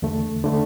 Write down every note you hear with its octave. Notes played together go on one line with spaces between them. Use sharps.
E2 D3 A3
D3 A3